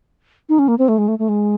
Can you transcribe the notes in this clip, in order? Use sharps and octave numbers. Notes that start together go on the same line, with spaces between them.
D#4
C#4
A#3
C4
A3
G#3
A3
A3
G#3